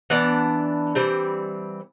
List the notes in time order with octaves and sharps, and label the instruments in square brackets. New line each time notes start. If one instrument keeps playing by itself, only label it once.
[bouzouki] E3 B3 D4 F#5
E3 G3 C4